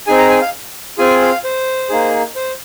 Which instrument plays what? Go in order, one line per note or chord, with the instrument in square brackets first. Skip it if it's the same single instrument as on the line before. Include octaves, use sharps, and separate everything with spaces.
[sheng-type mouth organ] C4 D#4 G#4 G#5
A#5
G#5
F5
C4 F4 G#4 G#5
F5
C5
A#3 D#4 G#4
C5